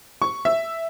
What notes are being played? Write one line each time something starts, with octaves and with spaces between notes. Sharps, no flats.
C#6
E5